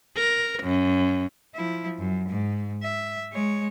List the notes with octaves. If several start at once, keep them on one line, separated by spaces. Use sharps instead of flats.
A#4
F#2
F3 E4
F#2
G#2
E5
G#3 C#5